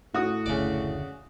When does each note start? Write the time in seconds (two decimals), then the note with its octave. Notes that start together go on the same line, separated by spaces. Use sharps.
0.14 A2 F#4 D#6
0.46 F#1 D2 C#3 D5